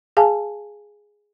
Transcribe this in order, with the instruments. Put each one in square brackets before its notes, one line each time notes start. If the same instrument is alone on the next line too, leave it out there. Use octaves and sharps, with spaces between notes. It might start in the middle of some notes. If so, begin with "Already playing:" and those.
[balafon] G#4 F5 G#5 A5